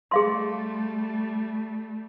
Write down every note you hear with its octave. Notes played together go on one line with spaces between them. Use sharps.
G3 A3 G#4 F5 C6